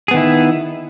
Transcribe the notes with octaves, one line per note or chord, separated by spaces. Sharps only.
D#3 B3 E4 G#4